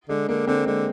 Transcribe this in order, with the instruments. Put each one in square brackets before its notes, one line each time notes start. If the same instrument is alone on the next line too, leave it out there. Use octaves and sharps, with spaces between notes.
[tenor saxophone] D3 [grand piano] G#3
[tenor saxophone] D3 [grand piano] A#3
[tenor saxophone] D3 [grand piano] C4
[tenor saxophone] D3 [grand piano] G#3